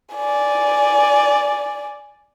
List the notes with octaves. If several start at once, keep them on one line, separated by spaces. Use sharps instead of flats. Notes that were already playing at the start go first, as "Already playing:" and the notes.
D5 G#5